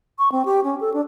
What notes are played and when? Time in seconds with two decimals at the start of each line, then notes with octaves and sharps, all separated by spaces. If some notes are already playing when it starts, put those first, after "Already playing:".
0.19 C#6
0.32 C4
0.45 G4
0.64 C#4
0.81 A4
0.94 D4